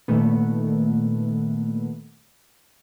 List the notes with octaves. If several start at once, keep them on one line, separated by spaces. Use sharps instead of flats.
A#2 D#3 A3 B3